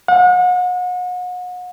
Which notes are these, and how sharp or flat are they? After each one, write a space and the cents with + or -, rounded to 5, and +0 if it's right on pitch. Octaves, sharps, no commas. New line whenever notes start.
F#5 -35